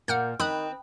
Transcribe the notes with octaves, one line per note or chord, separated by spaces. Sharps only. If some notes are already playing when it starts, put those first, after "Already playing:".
A#2 A#3 F#5 F6 G6
D#3 C4 B5 D#6 F#6